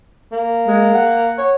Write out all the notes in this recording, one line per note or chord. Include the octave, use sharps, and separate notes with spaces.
A#3
G#3
F#5
C#5